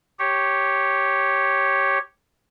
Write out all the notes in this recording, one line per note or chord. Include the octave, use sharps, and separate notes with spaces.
G4 C#5